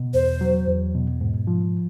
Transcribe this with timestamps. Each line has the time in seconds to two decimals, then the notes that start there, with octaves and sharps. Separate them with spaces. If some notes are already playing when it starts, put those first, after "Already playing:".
Already playing: B2
0.14 E2 C5
0.41 F#3
0.68 E2
0.94 B2
1.21 G#2
1.47 F3